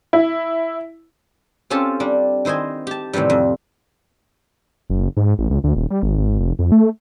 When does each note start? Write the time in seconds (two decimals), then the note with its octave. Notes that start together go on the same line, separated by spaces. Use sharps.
0.13 E4
1.70 C4 C#4 F4 G4 A4 A5
2.00 G3 D4
2.45 D#3 E4 C5 D#5 G#5
2.87 G4 A5
3.13 A2 C3 D#3 E3 G3
3.30 F2
4.90 F#1
5.17 G#2
5.39 A1
5.50 C#2
5.64 D2
5.76 D#1
5.90 G3
6.03 G#1
6.18 G#1
6.39 F1
6.59 F2
6.72 A3